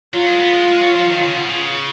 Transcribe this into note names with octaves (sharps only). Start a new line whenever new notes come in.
F#3 F4
G#3
B3
G#3
G#3
F#3
F3
D#3
C#3
B2
C#3